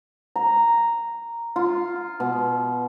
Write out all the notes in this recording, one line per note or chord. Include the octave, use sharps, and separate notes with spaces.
A#5
F4
B2